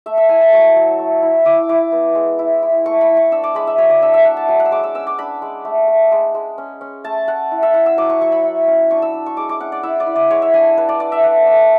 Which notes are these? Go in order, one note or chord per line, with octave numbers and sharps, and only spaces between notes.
A3 E5
E5
E4 G#5
A5
F#3 C#6
F#3
A3
E4
E4 D6
E4 D6
B3
G#3
E4
E4
A3 C#6
B5
E4
C#6
D4 E6
D6
G#3 B5
E5
F#3 C#5
D5
D4 E5
E5
A3 F#5
A5
F#3 G#5
F#5
E6
G#3 D6
E6
C#4 E6
D6
D4 B5
G#3
A3
A3
G#3
G#3
C#4
C#4
A3 A5
A3 F#5
E4
E5
E4 F#5
E6
F#3 D6
C#6
F#3 C#6
B5
E4
C#4
D4 C#6
E6
D4
C#6
G#3 D6
D6
C#4 F#5
D5
E4 E5
D5
E4
D5
G#3 C#5
E5
D4 G#5
D4 B4
D5
D4 D5
E5
A3 F#5
A3